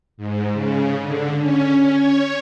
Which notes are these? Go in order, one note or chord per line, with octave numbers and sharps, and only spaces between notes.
G#2
C#3
D3
C#4
C#5